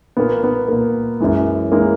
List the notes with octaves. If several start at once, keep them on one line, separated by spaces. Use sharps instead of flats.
A#2 A#3 B3
B3
A#2 A#3
F#2 E3 G#3
E3 G#3 A#3